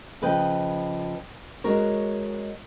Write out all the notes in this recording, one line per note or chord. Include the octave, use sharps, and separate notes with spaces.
C#3 F3 B4 D#5 G5
G#3 F#4 A#4 C#5